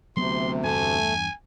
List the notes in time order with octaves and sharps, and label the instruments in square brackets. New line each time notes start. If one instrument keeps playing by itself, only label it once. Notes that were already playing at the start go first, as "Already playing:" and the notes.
[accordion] D2 C3 [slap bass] F#3 B3 C4 [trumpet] C6
[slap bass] E2 G2 [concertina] A3 [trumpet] G#5